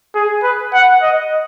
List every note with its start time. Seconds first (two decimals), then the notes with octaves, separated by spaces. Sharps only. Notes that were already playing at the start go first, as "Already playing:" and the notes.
0.15 G#4
0.43 B4
0.73 F#5
1.02 D#5